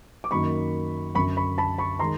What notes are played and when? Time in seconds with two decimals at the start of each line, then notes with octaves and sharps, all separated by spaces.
0.24 D6
0.31 F#2 D#3 F#3 A#3 B5 C#6
1.15 F#2 D3 F#3 B5 C#6
1.37 B5 C#6
1.58 A5 B5
1.78 B5 C#6
1.99 D#3 G#3 A#5 C6